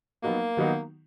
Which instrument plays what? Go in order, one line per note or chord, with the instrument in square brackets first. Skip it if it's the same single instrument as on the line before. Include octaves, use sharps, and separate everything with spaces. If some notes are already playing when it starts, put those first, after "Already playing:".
[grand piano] F#3 B3 D#4 F#4 [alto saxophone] A#3
[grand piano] D#3 F#3 B3 D#4 F#4